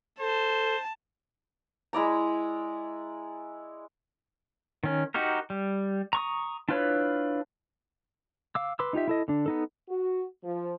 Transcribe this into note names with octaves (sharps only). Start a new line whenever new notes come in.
A4 C5 A5
G#3 E4 D5 A#5
D#3 C#4
D#4 F#4 G4 A#4
G3
A#5 C#6 D#6
D4 E4 F4 B4 C#5
F5 D6 E6
B4 C6 D6 E6
D#4 F4 G4 E5
E4 A4 D#5
D3 D4
B3 D#4 A4
F#4
F3